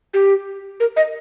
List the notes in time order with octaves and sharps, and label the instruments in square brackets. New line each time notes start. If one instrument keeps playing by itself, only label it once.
[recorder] G4
A#4
D#5